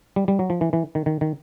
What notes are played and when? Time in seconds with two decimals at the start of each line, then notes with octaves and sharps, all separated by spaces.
0.16 G3
0.28 G3
0.39 F#3
0.50 F3
0.61 E3
0.73 E3
0.95 D#3
1.06 D#3
1.21 D#3